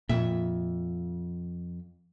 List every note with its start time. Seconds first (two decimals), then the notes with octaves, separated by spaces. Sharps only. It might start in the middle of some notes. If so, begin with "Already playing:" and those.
0.09 F2 A#2 E5